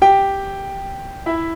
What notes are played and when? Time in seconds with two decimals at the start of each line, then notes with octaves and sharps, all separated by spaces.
0.02 G4 G5
1.26 E4 E5